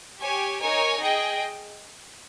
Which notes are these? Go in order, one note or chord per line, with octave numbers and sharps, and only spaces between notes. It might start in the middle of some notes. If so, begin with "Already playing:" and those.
G4 C#5 G#5
D#4 A#4 C#5 G#5
G#4 D#5 G5